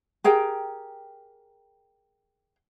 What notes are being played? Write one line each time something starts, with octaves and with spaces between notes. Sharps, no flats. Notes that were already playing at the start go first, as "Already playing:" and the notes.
G4 G#4 A#4 G5